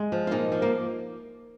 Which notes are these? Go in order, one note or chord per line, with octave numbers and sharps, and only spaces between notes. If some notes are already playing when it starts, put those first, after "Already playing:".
Already playing: G#3
F3
F4
A#2 D#4
F3
A#3